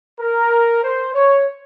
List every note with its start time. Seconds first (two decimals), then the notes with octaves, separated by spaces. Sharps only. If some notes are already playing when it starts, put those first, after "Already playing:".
0.20 A#4
0.83 C5
1.13 C#5